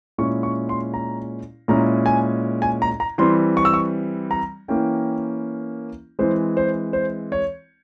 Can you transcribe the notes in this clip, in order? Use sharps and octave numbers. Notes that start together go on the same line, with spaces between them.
A#2 G#3 C#4 E4 C#6
C#6
C6
A#5
A#2 G#3 C#4 E4 A#5
G#5
G#5
A#5
A#5
E3 G3 C4 C6
C#6
E6
C#6
A#5
E3 A#3 C#4 E4 G5
E3 G#3 C4 C5
C5
C5
C#5